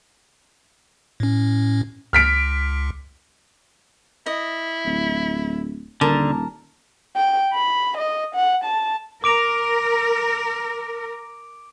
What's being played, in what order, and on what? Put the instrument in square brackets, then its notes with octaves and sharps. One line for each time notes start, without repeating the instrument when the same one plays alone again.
[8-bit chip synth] A2 C#4
[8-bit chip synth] C#2 [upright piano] F6 B6 D7
[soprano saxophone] E4 [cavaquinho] D#5
[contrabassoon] D1
[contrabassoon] D#1 [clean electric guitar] D3 [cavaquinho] A#4 A5
[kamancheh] G5
B5
D#5
F#5
A5
[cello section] A#4 [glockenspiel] D6 D7 F7